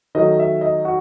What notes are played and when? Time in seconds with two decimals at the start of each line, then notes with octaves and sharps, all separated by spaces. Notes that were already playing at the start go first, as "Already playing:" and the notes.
0.15 D#3 F#3 A3 D#5
0.39 E5
0.61 D#5
0.85 F#4